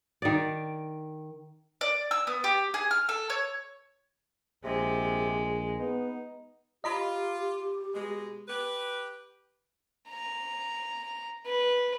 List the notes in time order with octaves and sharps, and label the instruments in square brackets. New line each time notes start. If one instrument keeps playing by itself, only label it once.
[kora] D#3 D5
[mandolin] D5
E6
B3
G4
G#4
F6
A4
C#5
[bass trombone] A#1 [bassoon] C3 [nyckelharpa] G#3
[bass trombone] B3 [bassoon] D#4
[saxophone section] F4 [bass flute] G4 [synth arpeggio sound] D#5 A#5 B5
[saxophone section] B2 G#3
G4 B4
[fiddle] A#5
B4